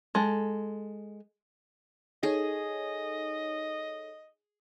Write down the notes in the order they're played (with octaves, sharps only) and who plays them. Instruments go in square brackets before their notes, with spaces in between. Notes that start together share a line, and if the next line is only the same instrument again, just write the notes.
[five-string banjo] G#3 A4
[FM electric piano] D#4 A4 C#5 [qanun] G#4 [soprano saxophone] D#5